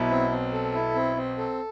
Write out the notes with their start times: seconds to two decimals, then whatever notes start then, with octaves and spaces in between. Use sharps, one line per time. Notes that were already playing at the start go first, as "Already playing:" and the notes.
Already playing: B1 B2 E4
0.10 C4
0.31 C4
0.53 A4
0.74 E4
0.95 C4
1.16 C4
1.37 A4